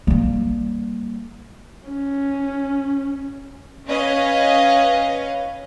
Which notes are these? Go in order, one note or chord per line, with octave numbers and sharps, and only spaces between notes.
G3 A#3
C#4
C#4 B4 C#5 D#5 F5